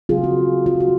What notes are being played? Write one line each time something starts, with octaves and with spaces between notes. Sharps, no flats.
C#3 F#3 C4 F4 G#4
F#4
F4
F#4